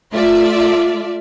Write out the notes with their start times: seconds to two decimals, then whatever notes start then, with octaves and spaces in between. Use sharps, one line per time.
0.12 A3 F4 D5 E5